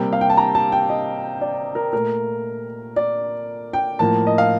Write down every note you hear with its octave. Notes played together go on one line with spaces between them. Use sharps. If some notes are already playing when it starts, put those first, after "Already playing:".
Already playing: C3 G3 A#3 G5
F5
G5
A5
A#5
A5
G5
D#5
D5
A#4
A#2 A3 A#4
D5
G5
A2 F3 A#3 A5
D#5
F5